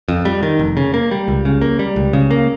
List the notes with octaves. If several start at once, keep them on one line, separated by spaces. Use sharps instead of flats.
F2
G3
D#3
F1
C#3
A#3
G3
C#2
C#3
A#3
G3
C#2
C#3
A#3